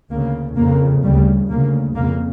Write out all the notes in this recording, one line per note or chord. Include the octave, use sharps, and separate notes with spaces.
D2 C#3 A#3
F2 C#3 A#3
D2 C#3 G3
D2 C#3 A#3
F2 C#3 A#3